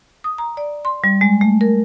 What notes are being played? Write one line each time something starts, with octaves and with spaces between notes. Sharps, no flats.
D#6
A#5
D5
C6
G3
G#3
A3
A#4